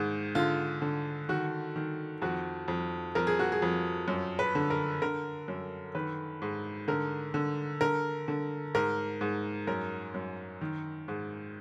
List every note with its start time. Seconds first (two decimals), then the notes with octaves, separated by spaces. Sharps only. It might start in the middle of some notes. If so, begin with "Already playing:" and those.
Already playing: G#2 D#3
0.35 D3 F4
0.82 D3
1.29 D#3 F#4
1.76 D#3
2.22 F2 F#4
2.68 F2
3.15 F2 A#4
3.27 G#4
3.39 F#4
3.52 G#4
3.62 F2
4.08 F#2
4.39 B4
4.55 D3
4.70 A#4
5.02 D3 A#4
5.48 F#2
5.95 D#3 B4
6.42 G#2
6.88 D3 A#4
7.34 D3
7.81 D3 A#4
8.28 D3
8.74 G#2 A#4
9.21 G#2
9.67 F#2 A#4
10.14 F#2
10.61 D#3
11.08 G#2